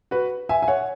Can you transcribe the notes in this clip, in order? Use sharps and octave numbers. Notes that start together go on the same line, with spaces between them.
F#4 B4
E5 G#5
G#5
C#5 F#5